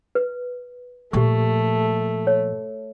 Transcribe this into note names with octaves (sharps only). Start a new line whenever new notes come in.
B4
A#2 F3 A3 G4 C#6
C#5